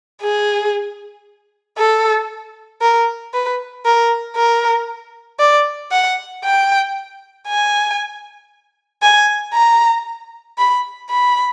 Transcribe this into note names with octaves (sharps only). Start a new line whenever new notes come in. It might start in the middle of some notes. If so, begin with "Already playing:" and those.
G#4
A4
A#4
B4
A#4
A#4
D5
F#5
G5
G#5
G#5
A#5
B5
B5